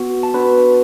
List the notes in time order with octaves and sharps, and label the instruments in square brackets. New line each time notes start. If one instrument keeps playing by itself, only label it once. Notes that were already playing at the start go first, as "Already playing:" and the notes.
Already playing: [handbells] B3 F#4
A5
B3 D4 F#4 B4 B5